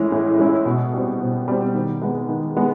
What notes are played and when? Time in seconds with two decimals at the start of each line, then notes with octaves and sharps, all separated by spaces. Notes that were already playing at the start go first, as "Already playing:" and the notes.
Already playing: A2 E3 G#3 C#4 E4
0.12 A2
0.39 E3 G#3 C#4 E4
0.66 B2
0.94 G3 C4
1.20 B2
1.48 G3 C4
1.75 D#3
2.01 G#3 B3
2.29 D#3
2.56 G#3 B3